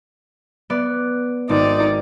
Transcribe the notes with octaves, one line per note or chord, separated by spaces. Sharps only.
B3 D5
G#1 D#4 D5